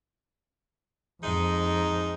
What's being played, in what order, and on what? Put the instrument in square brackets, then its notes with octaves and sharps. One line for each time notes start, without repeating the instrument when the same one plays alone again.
[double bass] F2 [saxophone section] G#2 D#4